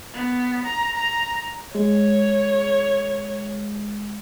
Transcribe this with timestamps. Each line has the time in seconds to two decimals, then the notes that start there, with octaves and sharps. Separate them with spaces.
0.14 B3
0.65 A#5
0.95 A#5
1.75 G#3 C#5